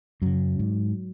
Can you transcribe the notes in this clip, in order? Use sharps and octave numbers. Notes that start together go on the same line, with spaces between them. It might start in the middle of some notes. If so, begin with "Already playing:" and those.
F#2 C#3 F#3
G#2